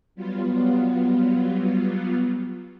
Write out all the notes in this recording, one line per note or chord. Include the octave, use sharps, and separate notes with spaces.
F#3 G3 B3 F4